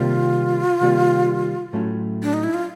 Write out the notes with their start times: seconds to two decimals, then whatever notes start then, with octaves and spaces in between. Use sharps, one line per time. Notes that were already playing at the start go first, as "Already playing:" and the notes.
Already playing: C3 D#3 G3 A#3 F4
0.81 C3 D#3 G3 A#3
1.73 A2 F#3 A3 C#4
2.23 D4
2.33 D#4
2.44 E4
2.54 F4